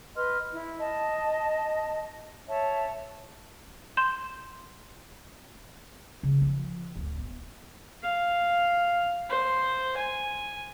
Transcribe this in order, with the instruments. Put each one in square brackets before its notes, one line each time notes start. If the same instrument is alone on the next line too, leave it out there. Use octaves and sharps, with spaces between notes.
[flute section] B4 D#5 C6 F6
E4
D#5 A5
C#5 E5 A5
[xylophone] C6 G6 E7
[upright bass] C#3
F3
D1
B3
[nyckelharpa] F5
C5
G#5